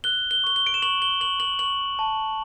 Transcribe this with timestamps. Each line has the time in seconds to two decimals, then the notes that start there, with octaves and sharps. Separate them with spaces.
0.04 F#6 G7
0.31 G7
0.44 C#6 G7
0.56 G7
0.66 D7
0.74 E7
0.82 C#6 F#7
1.02 G7
1.21 C#6 F#7
1.40 F#7
1.59 C#6 F#7
1.99 A5